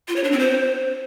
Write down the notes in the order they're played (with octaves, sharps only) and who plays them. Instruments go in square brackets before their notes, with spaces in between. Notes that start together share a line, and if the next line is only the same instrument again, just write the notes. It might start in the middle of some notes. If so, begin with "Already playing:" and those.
[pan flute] F4
C#5
D4
C4
C5